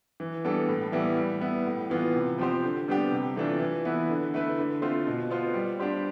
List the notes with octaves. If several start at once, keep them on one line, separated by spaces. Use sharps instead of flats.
E3
G3 B3 D4 A4
A2
E3 G3 B3 E4
G3
B3 E4
A2
E3 B3 F4
C3
F3 C4 G4 C5
D3
G3 B3 D4 G4
C3
E3 A3 D4 F4
E3
B3 E4 B4
D3
A3 E4 B4
D3
A3 C4 F4 C5
B2
B3 F4 C5
G3
D4 G4 C5